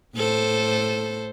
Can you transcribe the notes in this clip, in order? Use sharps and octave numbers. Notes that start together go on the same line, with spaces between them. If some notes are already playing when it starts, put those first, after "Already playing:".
A2 A4 C5